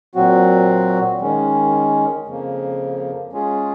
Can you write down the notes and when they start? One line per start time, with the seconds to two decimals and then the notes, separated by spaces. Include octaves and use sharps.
0.15 A#2 F#3 C4 F#4
1.21 D#3 G#3 C#4
2.26 F2 C#3 F3 A#3
3.33 G#3 C#4 F4 G#4